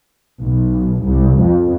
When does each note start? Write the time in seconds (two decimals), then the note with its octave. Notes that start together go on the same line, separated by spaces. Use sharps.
0.41 B1
1.04 C2
1.40 F2